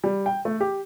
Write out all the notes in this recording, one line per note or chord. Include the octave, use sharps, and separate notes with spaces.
G3
G5
A3
G4